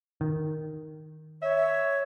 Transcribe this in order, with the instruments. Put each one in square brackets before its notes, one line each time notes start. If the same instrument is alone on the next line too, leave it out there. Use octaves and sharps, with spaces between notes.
[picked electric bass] D#3
[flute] C#5 [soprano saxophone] E5